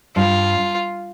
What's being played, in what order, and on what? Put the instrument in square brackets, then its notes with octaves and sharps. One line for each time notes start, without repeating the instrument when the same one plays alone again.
[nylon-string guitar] G2 [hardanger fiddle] F4